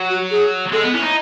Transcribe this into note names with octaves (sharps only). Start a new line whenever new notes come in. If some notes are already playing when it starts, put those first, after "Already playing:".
Already playing: F#3
F#4
G#4
G#3 A4
B3
C#4 E4
D#4